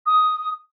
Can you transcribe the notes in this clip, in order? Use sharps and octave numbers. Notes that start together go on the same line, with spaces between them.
D#6